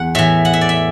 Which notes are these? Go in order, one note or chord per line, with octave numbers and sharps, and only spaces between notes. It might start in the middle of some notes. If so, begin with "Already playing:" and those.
Already playing: E2 F#5
A2 E3 E5
F#5
E5
D5
E5